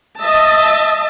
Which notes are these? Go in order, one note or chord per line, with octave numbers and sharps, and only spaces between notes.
D#5 E5 A5